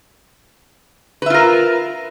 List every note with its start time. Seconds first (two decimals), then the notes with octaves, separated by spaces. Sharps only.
1.22 B4
1.26 E5
1.30 F4
1.34 A#4